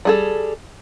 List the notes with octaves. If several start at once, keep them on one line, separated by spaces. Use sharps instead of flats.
G3 G#4 A4